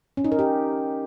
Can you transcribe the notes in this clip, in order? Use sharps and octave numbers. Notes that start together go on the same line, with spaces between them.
C#4
D#4
A#4
G4